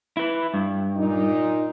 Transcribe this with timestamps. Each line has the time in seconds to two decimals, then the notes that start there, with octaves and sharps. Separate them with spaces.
0.17 E4 B4
0.54 G2
0.97 A#2 D#4